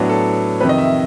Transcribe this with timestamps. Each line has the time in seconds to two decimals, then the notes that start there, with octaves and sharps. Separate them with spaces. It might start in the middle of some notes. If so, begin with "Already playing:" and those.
Already playing: A2 F#3 B3 D4
0.09 A4
0.60 F2 C3 D#3 B4
0.69 D#5
0.78 E5